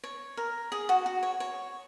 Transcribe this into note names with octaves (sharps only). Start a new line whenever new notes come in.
C#5
A#4
G#4
F#4
F#4
C#5
C#5